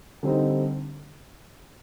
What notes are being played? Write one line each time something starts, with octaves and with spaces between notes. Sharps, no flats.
D3 G3 C4 D#4